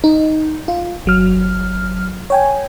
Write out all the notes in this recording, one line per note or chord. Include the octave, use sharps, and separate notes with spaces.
D#4
F4
G1 F#3 F6
C#5 G5 G#5